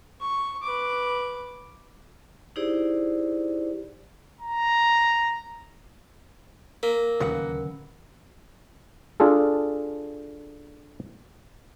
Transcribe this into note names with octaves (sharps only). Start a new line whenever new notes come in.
C#6
B4 D6
D#4 E4 G4 G#4 C5 D5
A#5
A#3 A#4
D1 D#2 C#3 B4 F#5
D4 F4 G#4 A4